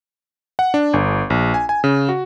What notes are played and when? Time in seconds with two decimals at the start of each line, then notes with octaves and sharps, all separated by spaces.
0.59 F#5
0.74 D4
0.93 G1
1.30 A#1
1.54 G#5
1.69 G#5
1.84 C#3
2.09 F#4